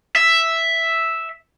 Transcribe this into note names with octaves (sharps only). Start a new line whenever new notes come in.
E5